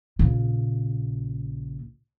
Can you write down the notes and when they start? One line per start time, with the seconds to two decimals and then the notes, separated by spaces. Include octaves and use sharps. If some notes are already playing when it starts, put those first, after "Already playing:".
0.19 A#1 C#3